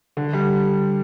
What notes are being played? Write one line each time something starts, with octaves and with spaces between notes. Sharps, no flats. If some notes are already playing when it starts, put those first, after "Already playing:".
D3
G3